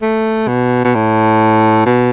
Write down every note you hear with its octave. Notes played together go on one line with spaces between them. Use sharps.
A3
B2
B2
A2
B2